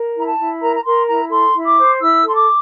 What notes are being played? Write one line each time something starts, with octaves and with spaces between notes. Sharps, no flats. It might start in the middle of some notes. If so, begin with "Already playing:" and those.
Already playing: A#4
E4 A#5
A5
E4
A#4 A#5
A#5
A#4 C6
E4 A#5
A4 C6
E4
D6
C5
E4 E6
A4 C6
D6